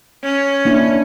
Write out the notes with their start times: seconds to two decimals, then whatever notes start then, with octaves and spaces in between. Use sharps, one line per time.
0.23 C#4
0.65 A#3 D4 E4